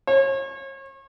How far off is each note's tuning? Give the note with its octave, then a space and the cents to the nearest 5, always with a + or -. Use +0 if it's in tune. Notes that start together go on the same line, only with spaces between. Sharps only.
C#5 -35